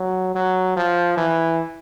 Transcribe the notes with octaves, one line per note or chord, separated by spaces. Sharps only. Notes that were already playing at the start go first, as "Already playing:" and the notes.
Already playing: F#3
F#3
F3
E3